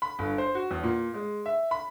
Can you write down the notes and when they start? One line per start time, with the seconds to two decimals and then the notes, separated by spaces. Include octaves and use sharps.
0.02 B5
0.19 G1
0.38 C5
0.55 F#4
0.71 E2
0.83 A#2
1.14 G#3
1.46 E5
1.71 B5